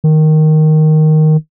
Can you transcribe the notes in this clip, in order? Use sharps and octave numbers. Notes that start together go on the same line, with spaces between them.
D#3